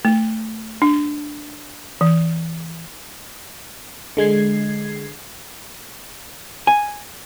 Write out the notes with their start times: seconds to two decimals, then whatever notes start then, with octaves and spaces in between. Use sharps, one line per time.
0.05 A3
0.82 D4
2.01 E3
4.17 D3 G#3 G#6 C7
6.67 G#5